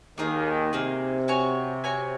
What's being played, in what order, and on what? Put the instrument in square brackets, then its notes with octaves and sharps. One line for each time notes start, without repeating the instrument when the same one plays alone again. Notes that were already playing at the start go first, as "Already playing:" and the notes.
[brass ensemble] D#2 D#3 [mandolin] A#3 D#4 G#4
[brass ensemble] C3 [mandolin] A#3 D#4 G#4
[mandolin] F#4 C#5 G#5
F#4 C#5 G#5